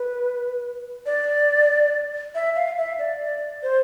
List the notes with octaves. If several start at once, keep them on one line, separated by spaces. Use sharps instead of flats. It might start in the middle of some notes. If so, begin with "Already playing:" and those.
Already playing: B4
D5
E5
F5
E5
D5
C5